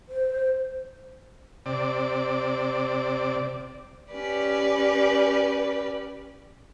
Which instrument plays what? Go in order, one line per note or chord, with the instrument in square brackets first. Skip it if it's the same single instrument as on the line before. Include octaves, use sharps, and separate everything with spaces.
[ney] C5
[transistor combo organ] C3 D5
[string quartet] C#4 G4 B4 D5